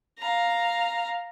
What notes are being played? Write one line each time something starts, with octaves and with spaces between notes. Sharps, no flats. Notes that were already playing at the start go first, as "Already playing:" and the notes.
F5 A#5